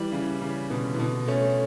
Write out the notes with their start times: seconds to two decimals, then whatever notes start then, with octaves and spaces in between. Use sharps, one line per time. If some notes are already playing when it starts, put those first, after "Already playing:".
Already playing: E3 G3
0.12 C#3 E3
0.41 C#3
0.70 B2 D3
0.94 E3
0.98 B2 D3
1.28 A3 C#4